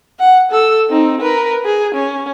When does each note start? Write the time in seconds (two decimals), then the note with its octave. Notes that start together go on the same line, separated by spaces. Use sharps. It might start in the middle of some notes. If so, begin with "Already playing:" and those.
0.20 F#5
0.51 A4 E6
0.90 C4 D#4
1.21 A#4 B4
1.65 G#4
1.95 C#4